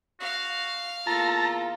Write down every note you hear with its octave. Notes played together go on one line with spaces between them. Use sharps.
F#4 F5 F6
E2 A#3 F4 A4 A5 A#5